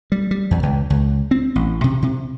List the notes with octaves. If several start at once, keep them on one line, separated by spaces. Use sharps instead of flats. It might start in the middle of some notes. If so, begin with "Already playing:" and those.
G3
G3
E2
C#2
C#2
C4
A1
C3
C3